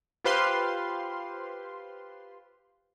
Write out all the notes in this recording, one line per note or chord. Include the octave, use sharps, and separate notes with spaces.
F4 G4 B4 C5 F5 C6